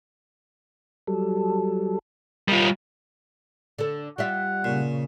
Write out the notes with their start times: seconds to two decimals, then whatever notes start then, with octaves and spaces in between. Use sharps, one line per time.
1.07 F#3 G3 A4
2.48 G3 F4 A#4 D#5
3.79 D3 A4
4.18 G3 F4 E5 F#5
4.64 A#2 C#3